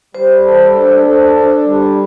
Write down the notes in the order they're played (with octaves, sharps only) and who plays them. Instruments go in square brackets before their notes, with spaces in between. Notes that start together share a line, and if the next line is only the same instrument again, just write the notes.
[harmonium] G3 [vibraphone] C5
[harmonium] A4
D4
A4
D4
G3